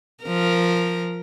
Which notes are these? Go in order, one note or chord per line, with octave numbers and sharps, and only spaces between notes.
F3 A#4